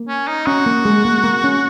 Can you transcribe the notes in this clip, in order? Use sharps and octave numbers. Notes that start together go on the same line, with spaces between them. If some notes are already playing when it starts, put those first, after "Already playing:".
Already playing: A#3
C#4
D#4
C#4 F#4
A#3
G#3
A#3
A#3
C#4